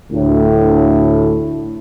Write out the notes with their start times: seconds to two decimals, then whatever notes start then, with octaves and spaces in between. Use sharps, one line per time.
0.12 D2 A2